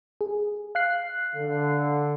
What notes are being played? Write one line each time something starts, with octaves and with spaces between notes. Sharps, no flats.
G#4
F5 F#6 C7
D3